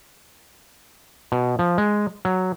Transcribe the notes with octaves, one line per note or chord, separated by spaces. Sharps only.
B2
F3
G#3
F#3